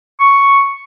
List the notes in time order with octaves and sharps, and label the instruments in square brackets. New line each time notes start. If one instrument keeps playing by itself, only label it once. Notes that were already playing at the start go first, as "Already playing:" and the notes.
[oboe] C#6